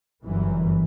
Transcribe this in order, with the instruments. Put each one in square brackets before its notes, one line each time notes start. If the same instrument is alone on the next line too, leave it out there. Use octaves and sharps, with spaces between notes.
[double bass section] G1 F#2 E3